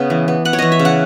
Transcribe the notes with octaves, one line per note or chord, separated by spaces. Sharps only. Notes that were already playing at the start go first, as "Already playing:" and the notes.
Already playing: C#3 B3
E3
B3
B3 F#5
C#5
E3 D#5
E5
C#3
F#5